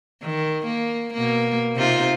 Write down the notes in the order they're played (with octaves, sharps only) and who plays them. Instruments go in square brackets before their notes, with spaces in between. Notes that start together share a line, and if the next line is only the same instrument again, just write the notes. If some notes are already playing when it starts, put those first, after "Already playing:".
[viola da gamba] D#3
A#3
B2 A#3
C3 D#4 F4